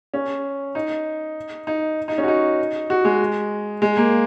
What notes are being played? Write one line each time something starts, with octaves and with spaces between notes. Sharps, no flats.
C#4
D#4
D#4
D#4
C#4
F#4
D#4
F#4
G#3
G#3
A#3